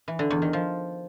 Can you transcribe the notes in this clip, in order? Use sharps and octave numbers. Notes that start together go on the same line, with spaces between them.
E3
D3
E2
D#3
F3